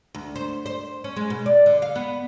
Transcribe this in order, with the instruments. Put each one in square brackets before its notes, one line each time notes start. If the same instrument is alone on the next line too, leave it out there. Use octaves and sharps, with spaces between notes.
[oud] D2
C5
C5
C#4
G#3
B2
D5
D3
F5
B3